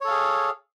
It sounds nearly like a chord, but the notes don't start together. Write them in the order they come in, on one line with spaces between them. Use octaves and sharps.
C#5 A4 F5 G#4